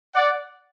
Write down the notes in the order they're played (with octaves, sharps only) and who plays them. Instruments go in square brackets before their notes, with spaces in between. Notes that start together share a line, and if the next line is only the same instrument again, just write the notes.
[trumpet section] D5 F#5